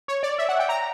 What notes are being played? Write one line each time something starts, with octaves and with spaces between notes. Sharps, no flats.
C#5
D5
E5
F#5
G5
A#5